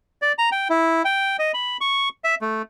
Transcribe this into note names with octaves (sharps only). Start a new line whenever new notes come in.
D5
A#5
G5
E4
G5
D#5
B5
C#6
E5
A3